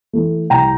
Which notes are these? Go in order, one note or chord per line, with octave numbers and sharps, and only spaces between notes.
E3 A3
C2 G5 A#5